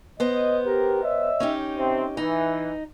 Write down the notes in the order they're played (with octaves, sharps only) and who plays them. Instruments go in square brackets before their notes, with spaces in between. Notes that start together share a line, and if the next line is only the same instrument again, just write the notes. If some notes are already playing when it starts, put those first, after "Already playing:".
[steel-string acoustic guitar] B3 C5 [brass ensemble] D#5
[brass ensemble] G4 A#4
C#5 D#5 E5
[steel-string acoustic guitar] C#4 D#4 G4
[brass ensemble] C3 C4
[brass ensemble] E3 [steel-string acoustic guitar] D#4